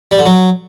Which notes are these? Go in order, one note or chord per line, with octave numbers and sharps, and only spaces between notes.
G3
D3
F#3